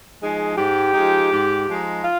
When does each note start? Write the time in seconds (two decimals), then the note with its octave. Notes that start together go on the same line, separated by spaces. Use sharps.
0.20 F3 G#3 D#4 G#4
0.57 G#2 G4
0.93 F3 G#3 D#4
1.31 G#2
1.68 F3 G#3 D#4
2.04 F4